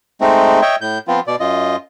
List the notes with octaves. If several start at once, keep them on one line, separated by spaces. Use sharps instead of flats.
G#3 A3 C4 D#4
C#5 D#5 E5 G5
A2 G6
F3 B3 C4 F4
B2 D5
F#2 F4 D#5